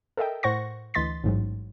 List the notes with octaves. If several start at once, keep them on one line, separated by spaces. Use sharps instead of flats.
A4 A#4 D#5 E5 G5
A2 C5 F#5 C#6 A#6
D2 E3 D#5 C6 A6 B6
A1 G#2 F#3